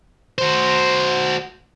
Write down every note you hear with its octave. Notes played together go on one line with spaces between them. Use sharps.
F#4 C5